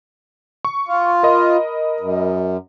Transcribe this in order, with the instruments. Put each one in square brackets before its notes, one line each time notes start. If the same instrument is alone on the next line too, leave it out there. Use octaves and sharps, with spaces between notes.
[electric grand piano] C#6
[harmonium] F4
[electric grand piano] A#4 D#5 B5
[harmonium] F#2